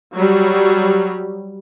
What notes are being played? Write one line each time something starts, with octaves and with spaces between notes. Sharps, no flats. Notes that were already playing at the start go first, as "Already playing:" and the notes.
F#3 G3